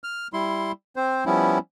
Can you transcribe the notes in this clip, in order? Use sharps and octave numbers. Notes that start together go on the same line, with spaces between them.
F6
G3 E4 C6
C4 C5
F3 G3 B3 C#4 E4